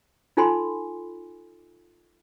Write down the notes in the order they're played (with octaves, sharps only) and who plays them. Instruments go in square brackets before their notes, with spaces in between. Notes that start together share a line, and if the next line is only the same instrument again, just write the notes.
[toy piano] D#4 F4 A4 G#5 B5 C6